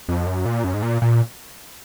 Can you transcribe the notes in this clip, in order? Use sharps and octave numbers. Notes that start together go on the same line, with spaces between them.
F2
F#2
A#2
F#2
G#2
A#2
A#2